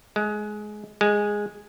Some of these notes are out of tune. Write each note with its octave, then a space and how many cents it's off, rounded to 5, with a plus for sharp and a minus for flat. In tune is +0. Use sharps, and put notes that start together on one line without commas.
G#3 +20
G#3 -5